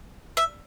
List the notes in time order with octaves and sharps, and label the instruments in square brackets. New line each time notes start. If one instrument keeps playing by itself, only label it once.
[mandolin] E5